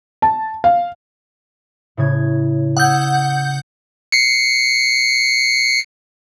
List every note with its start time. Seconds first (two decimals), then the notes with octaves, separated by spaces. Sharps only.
0.22 A5
0.64 F5
1.97 A2 C#3 G#6
2.77 F#5 D#6 E6 G6 G#6
4.12 C7 C#7